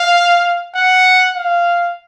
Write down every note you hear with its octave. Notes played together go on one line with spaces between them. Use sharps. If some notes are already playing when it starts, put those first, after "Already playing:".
Already playing: F5
F#5
F5